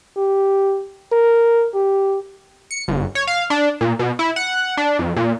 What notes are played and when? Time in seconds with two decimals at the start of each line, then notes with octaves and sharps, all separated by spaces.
0.17 G4
1.12 A#4
1.74 G4
2.71 C#7
2.88 G1
3.15 C#5
3.27 F5
3.50 D4
3.81 A#2
3.99 B2
4.19 E4
4.36 F#5
4.77 D4
4.99 F2
5.16 A#2